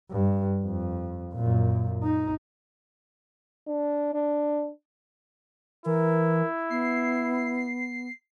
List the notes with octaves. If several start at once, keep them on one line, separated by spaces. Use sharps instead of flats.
G2
F2
F#2 A#2
D#4
D4
D4
E3 E4 A#4
B3 C7